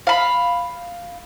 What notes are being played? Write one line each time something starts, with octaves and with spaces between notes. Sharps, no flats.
F5 B5